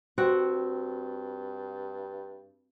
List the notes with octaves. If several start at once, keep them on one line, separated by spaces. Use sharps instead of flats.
G2 C4 F#4 F#5